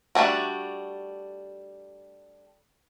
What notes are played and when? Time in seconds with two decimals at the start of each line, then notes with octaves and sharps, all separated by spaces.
0.15 G3 A3 D4 F#4